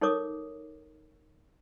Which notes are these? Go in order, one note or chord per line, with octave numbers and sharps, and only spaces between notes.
D#4 A4 A#4 C#5 D6 D#6